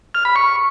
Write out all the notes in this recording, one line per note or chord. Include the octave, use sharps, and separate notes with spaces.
F6
B5
C#6